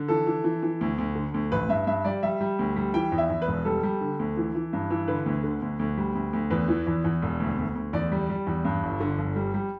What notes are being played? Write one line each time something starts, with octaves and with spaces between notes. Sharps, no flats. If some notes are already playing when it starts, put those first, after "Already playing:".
Already playing: D3
E3 A4
E3
E3
E3
D2
D2
D3
D2
A1 B4
G2 E5
G2 E5
G3 D5
G3 E5
G3
D2
G3
E3 G5
E2
E5
E2
B4
E1
G3 A4
G3
D3
D2
E3
E3
G2
E3
D3 B4
D2
D3
D2
D2
G3
D2
D2
E2 B4
E3
E2
E2
E1
D2
D2
D2
E2 D5
G3
G3
E2
G2
G1
D3
G1
G3
G3